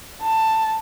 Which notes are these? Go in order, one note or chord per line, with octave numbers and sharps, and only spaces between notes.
A5